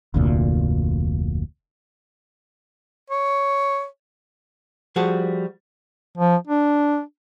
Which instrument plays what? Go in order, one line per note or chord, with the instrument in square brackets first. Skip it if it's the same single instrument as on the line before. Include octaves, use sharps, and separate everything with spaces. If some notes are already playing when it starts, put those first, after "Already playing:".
[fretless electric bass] F1 D2 A#2
[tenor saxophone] C#5
[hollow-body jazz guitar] F3 G3 F#4 G#4 A5
[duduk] F3
D4